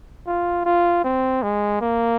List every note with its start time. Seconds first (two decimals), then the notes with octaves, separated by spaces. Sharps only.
0.27 F4
0.65 F4
1.04 C4
1.42 G#3
1.81 A#3